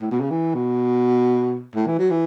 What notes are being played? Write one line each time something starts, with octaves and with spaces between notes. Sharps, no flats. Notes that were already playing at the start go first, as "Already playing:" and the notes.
A2
B2
C#3
E3
B2
A2
E3
F#3
E3